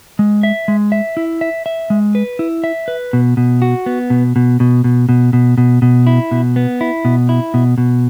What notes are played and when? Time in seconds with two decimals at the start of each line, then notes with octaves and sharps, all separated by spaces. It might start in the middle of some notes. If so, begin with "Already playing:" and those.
0.19 G#3
0.43 E5
0.68 G#3
0.92 E5
1.17 E4
1.41 E5
1.66 E5
1.90 G#3
2.15 B4
2.39 E4
2.64 E5
2.88 B4
3.13 B2
3.37 B2
3.62 F#4
3.86 B3
4.10 B2
4.36 B2
4.60 B2
4.84 B2
5.09 B2
5.33 B2
5.58 B2
5.82 B2
6.07 E4
6.31 B2
6.56 B3
6.81 E4
7.05 B2
7.29 E4
7.54 B2
7.78 B2